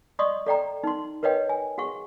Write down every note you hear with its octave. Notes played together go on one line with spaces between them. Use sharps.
D5 D#5 C6 C#6 D#6
A4 D5 G5 A#5
D#4 C6
A#4 B4 C#5 D#5 G5
G#5
F#4 G#4 F#5 C#6